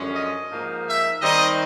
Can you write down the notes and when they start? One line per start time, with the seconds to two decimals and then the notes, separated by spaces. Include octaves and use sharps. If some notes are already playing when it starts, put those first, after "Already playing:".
Already playing: F#2 D3 F3 G#3 C#4
0.14 D#5
0.51 G#2 F3 A#3 D#4
0.86 E5
1.22 D#3 G3 C4 D#4 D#5